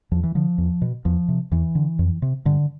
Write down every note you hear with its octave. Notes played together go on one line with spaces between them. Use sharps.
E2 F3
E3
D3 F3
E2
B2
E2 F3
C3
E2 E3
D3
F2
C3
G2 D3